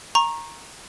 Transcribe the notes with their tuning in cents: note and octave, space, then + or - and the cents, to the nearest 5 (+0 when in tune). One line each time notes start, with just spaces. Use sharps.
A#5 +0 C#6 -25